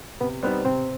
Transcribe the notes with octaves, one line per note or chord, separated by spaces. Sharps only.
C3 B3 B4
G3 B3 C4 D#4 C5
C3 C4 C5